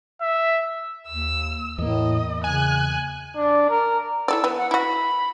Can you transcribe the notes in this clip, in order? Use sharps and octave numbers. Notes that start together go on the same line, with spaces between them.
E5
D#2 E6
E2 A2 A#3 D#5
C#3 G#5 F#6
D4
A#4
E4 A4 D5 E6
E3 B3
F#5
E4 F#4 B5